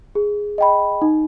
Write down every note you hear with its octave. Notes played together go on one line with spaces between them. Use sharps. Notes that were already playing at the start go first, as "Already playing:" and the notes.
G#4
D#5 G5 B5
D#4